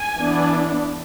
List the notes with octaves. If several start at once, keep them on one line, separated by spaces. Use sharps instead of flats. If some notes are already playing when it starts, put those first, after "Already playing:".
Already playing: G#5
E3 B3 D4